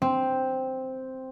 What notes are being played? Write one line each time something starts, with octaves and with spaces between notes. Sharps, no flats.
C4